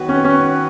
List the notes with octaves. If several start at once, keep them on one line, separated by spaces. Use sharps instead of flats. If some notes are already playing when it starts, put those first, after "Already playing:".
Already playing: D#3 F#3 B3 F#4 B4
C#4
C#4